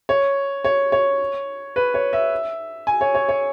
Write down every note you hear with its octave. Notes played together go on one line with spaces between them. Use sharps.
C#5
C#5
C#5
B4
C#5
E5
G#5
C#5
C#5
C#5